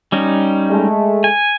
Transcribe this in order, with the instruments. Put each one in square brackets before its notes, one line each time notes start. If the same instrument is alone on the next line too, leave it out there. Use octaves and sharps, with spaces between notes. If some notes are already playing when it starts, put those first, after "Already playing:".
[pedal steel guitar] G3 C#4 D#4
[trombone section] G#3 A3
[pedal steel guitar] G#5